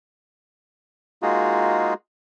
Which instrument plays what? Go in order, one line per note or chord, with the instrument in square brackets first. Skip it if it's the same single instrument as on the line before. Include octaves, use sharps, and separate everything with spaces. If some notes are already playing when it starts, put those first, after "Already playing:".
[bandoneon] G#3 A#3 D#4 F4 F#4 G#4